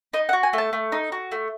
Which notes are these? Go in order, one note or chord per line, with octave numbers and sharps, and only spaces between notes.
D#4 D#5
F#5
F#4
G#5
A3 A5
A3
D#4
F#4
A3